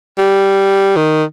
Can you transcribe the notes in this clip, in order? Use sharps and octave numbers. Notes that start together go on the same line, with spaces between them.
G3
D#3